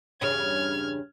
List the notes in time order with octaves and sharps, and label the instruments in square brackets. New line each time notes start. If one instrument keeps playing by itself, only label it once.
[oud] E2 G2 C#3 [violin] F6 G#6